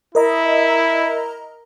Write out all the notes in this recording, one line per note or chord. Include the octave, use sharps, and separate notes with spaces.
E4 A#4 D#5 A#5